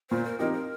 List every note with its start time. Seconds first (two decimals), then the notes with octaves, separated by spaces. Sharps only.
0.11 A#2 C5
0.25 A#4
0.39 F3 C4 D#4 G4 A#4
0.53 A#4